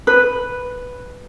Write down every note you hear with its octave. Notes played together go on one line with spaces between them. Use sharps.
B4